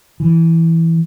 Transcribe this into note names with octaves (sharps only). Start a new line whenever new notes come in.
E3